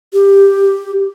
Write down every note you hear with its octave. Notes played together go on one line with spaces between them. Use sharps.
G4